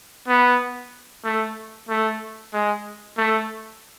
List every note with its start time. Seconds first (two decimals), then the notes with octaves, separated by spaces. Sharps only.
0.28 B3
1.25 A3
1.89 A3
2.53 G#3
3.18 A3